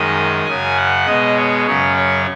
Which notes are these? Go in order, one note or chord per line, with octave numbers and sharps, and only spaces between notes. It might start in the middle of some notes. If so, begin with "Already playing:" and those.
Already playing: F#2 D#3 G#3 D#5
F#2 C#3 F#3 G#5
F#5
B2 G#3 D#5
C#5
F#2 C#3 F#3 C#5
C#5